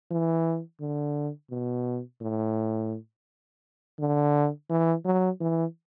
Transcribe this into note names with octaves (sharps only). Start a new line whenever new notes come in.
E3
D3
B2
A2
D3
E3
F#3
E3